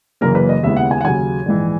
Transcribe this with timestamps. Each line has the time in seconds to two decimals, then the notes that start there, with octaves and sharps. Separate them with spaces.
0.21 F#1 F#2 C#3 E3 A#3 A#4
0.35 B4
0.49 D#5
0.63 D#2 C#3 G#3 B3 E4 E5
0.77 F#5
0.91 G#5
1.01 F#5
1.05 D#2 C#3 F#3 G#5
1.46 A#1 G#2 E3